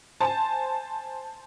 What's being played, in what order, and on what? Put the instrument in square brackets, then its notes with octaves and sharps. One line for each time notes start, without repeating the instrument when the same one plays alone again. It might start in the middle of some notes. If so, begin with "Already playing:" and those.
[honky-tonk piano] C5 G#5 A5